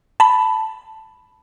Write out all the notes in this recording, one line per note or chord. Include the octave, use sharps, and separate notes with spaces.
A5 B5